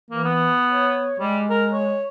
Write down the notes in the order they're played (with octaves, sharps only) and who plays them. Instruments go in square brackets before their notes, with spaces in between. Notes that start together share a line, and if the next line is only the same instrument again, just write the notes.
[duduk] E3 [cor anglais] A#3
[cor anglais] B3
[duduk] C#5
[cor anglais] G3 [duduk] G#3
[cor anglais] A#4
C#5